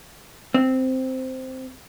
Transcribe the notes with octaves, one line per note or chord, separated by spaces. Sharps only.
C4